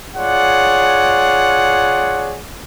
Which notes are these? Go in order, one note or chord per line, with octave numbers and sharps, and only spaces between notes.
F4 G#4 C#5 D5 F#5